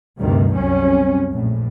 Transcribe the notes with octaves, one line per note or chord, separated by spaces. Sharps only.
D2 G2 C3 D#3 G3
C2 F#2 G3 C4 C#4
A#1 A2